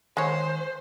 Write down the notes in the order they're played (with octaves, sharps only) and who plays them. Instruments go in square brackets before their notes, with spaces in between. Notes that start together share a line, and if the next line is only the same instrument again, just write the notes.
[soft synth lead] D#3 [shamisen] G#3 C#5 [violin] C5